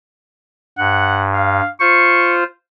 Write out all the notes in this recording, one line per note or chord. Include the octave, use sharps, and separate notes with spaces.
G2 F#5
F5
F4 C5 C#6